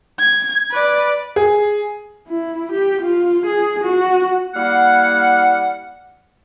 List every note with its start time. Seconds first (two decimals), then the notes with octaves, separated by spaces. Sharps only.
0.19 G#6
0.71 B4 D5
1.36 G#4
2.28 E4
2.72 G4
3.02 F4
3.46 G#4
3.84 F#4
4.55 G3 A#3 E4 F5 F#5